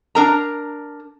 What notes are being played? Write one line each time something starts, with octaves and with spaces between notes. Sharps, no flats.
D4 A#4 A#5